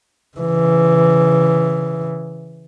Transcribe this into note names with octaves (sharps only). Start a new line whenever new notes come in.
C#3 E3